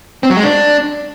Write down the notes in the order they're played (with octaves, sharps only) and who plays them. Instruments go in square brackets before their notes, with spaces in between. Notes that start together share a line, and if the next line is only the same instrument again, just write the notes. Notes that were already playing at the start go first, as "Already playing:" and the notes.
[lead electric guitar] C4
F#3
G#3
D4